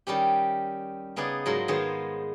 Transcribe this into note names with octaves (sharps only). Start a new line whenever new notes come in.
D#3 G3 C#4 G4
C#3 B3 D#4 G#4 D5
G#2 F#3 F4 A#4 C6
D#3 G#3 B3 D#4 C5 C#5